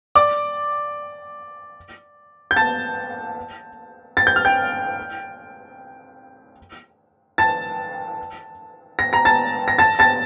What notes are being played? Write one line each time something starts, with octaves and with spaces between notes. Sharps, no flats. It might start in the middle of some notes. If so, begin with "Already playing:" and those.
D5 D6
G6
A5 A6
A6
G6
F6
G5 G6
A5 A6
A#6
A#5 A#6
A5 A6
A#6
A5 A6
A5 A6